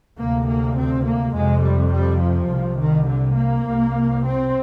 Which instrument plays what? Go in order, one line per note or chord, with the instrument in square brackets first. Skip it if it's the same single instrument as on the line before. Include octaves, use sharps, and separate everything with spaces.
[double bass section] D2 C3 A#3
A#3
C4
A#3
F2 C3 G#3
G3
G3
F3
C2 C3
D#3
D3
A#3
C2 C3
C4